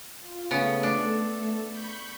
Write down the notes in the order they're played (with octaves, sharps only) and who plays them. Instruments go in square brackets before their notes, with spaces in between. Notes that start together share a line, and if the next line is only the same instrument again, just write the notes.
[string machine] F4
[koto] C#3 B3 [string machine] A3 A4
[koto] D4
[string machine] B5 C#6 G6